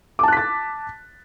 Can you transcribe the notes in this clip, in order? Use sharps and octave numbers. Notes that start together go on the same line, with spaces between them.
A5 D6 F#6 A6 B6